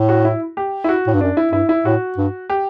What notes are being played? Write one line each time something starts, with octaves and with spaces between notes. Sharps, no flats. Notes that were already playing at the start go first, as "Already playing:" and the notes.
Already playing: A2
F#4
E4
G4
E4
F#4
A2
G2
F#2 D4
E4
G2 E4
E4
A2 F#4
G2
G4